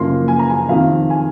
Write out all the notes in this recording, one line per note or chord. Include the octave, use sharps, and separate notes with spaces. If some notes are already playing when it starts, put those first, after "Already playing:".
Already playing: F#1 F#2 F3 A#3 C6
G#5
A#5
G#5
F2 C3 D#3 F5
G#5